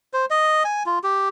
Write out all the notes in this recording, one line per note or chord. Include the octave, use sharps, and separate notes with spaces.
C5
D#5
G#5
F4
G4